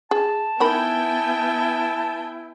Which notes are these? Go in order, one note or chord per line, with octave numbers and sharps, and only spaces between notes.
G#4 A5
B3 D#4 E4 A#4 G5 G#5 B5